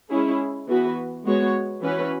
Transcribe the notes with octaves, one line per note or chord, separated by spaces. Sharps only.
G#3 C#4 E4 G#4
E3 B3 F#4 B4
G#3 B3 F#4 C#5
E3 C#4 F#4 B4